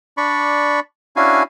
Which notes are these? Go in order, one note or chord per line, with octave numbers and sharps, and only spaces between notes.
D4 D5 B5 C#6
C#4 D4 E4 F#4 F5 G#5